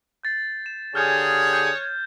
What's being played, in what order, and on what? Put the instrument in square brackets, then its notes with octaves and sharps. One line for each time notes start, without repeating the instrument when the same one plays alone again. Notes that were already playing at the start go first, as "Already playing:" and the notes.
[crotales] G6 A6 C7
E7
[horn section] D3 G4 G#4 [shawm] C#5 [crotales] F6 G6 G#6
[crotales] G6